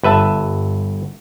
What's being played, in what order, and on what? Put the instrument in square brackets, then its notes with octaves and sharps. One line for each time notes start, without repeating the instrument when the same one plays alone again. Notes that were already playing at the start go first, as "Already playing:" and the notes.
[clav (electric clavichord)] G1 B4 E5 A5